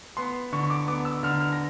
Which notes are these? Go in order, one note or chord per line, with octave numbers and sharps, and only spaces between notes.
B3 C6
D3 C#6
C#6
D6
B3 D6
E6
D3 F6
F6
A#6